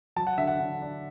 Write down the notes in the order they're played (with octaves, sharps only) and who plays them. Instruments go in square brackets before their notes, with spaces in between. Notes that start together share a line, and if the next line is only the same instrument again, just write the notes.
[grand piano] F#3 A5
F#5
D3 E5
F#5
D3
D4